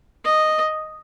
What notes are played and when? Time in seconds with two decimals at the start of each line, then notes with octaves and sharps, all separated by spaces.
0.24 D#5